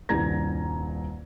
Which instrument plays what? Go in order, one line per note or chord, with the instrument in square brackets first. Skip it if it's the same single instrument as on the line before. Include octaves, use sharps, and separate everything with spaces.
[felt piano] D#1 C2 G2 A#5 G#6 A#6